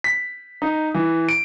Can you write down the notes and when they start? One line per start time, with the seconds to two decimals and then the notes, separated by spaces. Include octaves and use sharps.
0.04 B6
0.62 D#4
0.94 E3
1.29 D7